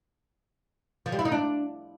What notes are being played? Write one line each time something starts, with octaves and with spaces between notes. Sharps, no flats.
F3
G3
E4
D#4
D4